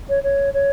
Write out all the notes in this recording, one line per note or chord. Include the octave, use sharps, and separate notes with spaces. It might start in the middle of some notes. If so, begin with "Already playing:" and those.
C#5
C#5
C#5